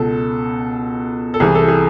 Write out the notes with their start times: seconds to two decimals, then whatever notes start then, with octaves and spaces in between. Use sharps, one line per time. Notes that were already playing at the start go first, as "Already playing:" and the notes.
Already playing: C#2 B2 A4
1.34 A4
1.40 C2 C3 E3 G#4
1.55 A4
1.68 G#4